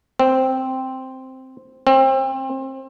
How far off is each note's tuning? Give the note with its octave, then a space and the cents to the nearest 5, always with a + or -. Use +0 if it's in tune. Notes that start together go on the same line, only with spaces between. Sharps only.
C4 +0
C4 +30